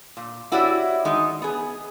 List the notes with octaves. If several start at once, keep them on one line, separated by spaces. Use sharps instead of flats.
A#2
E4 F#4 G4 C#5 D5 E5
D#3 G#3 D#4 D#5
B3 G#4